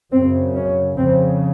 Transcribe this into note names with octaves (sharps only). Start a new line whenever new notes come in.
F#2 C#3 C4
C#4
F2 C#3 C4